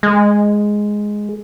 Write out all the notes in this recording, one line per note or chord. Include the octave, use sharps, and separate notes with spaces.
G#3